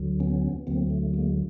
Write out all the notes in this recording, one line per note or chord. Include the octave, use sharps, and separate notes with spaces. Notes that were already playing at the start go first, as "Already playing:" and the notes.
Already playing: D2 D3 F#3
B3 C#4
D2 D3 F#3 A#3 C4
A3
G#3 A#3